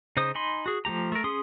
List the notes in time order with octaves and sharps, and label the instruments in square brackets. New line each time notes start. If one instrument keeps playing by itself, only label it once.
[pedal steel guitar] C#3 D#4 C5 D#6
D#4 G#5 B5 C6
F#4 G#4
F3 A3 G4 A#5
A3 A#4
C#4 G#4 C6 D#6